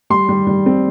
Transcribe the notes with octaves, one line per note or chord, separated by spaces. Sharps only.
G3 C6
G3
G3
C4